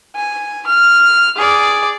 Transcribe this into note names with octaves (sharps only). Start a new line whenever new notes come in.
G#5
F6
G#4 D5